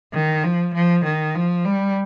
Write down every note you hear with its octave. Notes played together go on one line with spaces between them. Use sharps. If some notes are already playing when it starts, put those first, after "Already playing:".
D#3
F3
F3
D#3
F3
G3